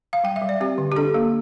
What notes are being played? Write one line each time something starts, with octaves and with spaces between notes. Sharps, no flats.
F5
G3 G5
E5
G3
D5
C4 G4
D3
G4
D4 A4
A#3